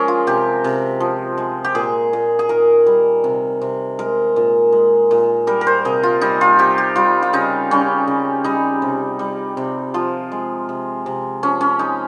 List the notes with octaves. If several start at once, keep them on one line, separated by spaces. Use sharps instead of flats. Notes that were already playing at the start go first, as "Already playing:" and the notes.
Already playing: F3 G#3 C#4 G#4 A#4
F4
C3 G4
C3
F3
G#3
G4
A#2 G#4
A#2
G#4
D#3 A#4
G3
C3
C3
G#3 A#4
A#2
G#3
A#2
G3 A#4
A#4
C5
C3 G#4
F4
G3 D#4
F4
C3 G4
G4
G3 F4
F4
C#3 D#4
G3 C#4
C#3
G3 D#4
C3
G3
C3
F3 F4
G#3
C3
C3
F3 C#4
C#4
G#3 D#4